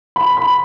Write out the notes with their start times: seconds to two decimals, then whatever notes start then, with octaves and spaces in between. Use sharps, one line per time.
0.16 B5
0.37 B5